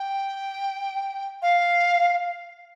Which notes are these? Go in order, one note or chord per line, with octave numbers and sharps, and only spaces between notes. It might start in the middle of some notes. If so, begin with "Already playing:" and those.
Already playing: G5
F5